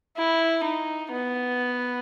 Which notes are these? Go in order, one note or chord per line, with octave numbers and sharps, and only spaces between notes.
E4
D#4
B3